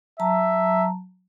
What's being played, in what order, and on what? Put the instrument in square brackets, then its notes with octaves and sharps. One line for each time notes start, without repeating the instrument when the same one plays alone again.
[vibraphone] F#3 A5 A#5 [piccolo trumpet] E5